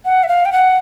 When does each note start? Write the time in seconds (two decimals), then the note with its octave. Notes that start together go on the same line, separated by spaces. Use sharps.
0.05 F#5
0.23 E5
0.28 F5
0.45 G5
0.52 F#5